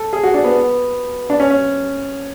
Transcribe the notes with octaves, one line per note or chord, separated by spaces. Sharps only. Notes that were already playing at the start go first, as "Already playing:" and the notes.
Already playing: A4
G#4
F#4
D4
B3
D4
C#4
C#4